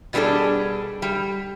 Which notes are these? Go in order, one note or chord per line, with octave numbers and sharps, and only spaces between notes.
B2 F#3 G3 D4 G#4 A4
G3